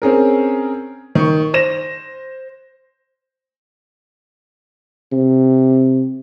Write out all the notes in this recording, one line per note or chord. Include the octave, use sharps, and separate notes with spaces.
C4 C#4 G#4 A#4
D#3 C#6
C5 A#6 E7
C3